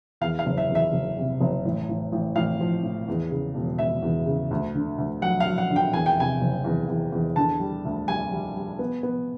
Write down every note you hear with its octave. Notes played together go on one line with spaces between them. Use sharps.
E2 F5
F5
F#1
E5
E2
E5
F#1
C3
F#1
A1
A1
A1
A1 F5
F3
A2
E2
C#3
E1
E1 E5
E2
C#3
D2
D3
D2
F#3 F#5
F5
F#3
F#5
D3
G5
E2 G#5
G5
C3 G#5
F#1
E2
E2
E2
D3 A5
G3
D2
G3 G#5
G3
G3
B3
B3